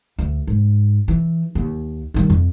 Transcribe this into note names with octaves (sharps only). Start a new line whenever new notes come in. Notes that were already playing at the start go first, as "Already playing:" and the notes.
D2
G#2
E3
D#2
D#3 G3
F2